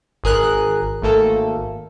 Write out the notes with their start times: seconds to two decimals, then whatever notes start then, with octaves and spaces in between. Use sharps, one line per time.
0.24 G#1 G#4 A#4 F#6
1.02 G#1 A3 A#3 A4